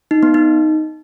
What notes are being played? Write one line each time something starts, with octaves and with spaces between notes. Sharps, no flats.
D#4
B3
D#4